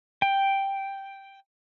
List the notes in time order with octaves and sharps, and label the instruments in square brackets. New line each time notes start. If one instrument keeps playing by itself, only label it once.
[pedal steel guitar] G5